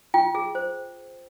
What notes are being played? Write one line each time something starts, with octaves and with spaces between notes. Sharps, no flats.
F4 G5
G#4
C5